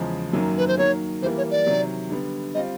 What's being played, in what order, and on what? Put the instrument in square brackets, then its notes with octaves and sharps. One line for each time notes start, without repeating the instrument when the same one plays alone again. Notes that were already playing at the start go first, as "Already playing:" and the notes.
Already playing: [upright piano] E2 C#3 F3 G#3
F#2 D#3 F#3 A#3
[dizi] B4
C5
[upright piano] D#3 F#3 A#3 [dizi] C#5
[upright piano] E3 G3 A#3 [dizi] C5
[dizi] C#5
D5
[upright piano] C3 D#3 F#3
D3 G3 B3
[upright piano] G3 C4 F4 [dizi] D#5